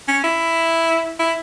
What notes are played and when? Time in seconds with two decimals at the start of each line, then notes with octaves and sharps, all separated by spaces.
0.08 C#4
0.24 E4
1.19 E4